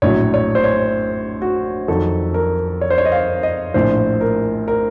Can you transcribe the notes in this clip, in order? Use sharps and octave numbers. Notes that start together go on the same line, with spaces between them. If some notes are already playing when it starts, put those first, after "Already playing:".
A#1 A2 F#3 C#5
C#5
C5
C#5
F#4
F2 D#3 F#3 A4
A#4
C#5
C5
C#5
D#5
F5
D#5
A#1 A2 F3 C5
A#4
A#4